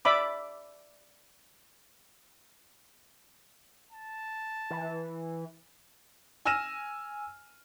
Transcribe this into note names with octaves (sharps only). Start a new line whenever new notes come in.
D5 E5 B5 D6
A5
E3
G#5 E6 F6 A#6 D#7 E7